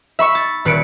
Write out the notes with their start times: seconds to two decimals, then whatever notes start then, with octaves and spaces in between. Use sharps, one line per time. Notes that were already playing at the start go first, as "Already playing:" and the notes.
0.19 E5 B5 C#6
0.35 A6
0.65 D#1 B4 C#7 D7